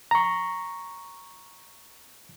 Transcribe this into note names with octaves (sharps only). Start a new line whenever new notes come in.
A#5 C#6